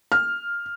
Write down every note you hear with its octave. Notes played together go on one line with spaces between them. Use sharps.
F6